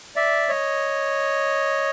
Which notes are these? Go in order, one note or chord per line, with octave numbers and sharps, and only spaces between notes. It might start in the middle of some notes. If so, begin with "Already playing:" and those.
D5 E5
C#5 D#5